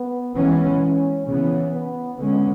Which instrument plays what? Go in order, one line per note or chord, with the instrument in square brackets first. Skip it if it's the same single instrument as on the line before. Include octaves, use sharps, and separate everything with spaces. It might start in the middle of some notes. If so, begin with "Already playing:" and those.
Already playing: [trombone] B3
[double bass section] E3 G#3 C#4 [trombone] B3
[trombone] C#4
[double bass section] C#3 E3 B3 [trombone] C#4
[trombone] B3
[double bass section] D3 G#3 C#4 [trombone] B3